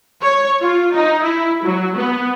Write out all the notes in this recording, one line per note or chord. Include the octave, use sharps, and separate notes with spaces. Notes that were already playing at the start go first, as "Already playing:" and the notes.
C#5
F4
D#4
E4
F#3
B3